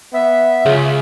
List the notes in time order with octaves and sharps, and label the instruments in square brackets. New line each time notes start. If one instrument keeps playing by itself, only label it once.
[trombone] B3 [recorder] E5
[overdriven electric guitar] C#2 [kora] C#3 F4